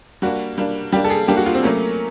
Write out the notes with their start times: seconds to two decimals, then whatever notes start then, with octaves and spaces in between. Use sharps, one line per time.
0.22 G3 A#3 D4 F#4
0.58 G3 A#3 D4
0.92 G3 A#3 D4 G4
1.04 A4
1.10 G#4
1.28 G3 A#3 D4 G4
1.37 F#4
1.46 F4
1.54 C4
1.63 F#3 A3 A#3 C#4